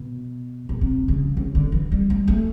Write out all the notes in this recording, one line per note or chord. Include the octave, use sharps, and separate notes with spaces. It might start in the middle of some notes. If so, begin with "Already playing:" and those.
Already playing: B2
B2
C3
C#3
C#3
D3
E3
G3
G#3
A3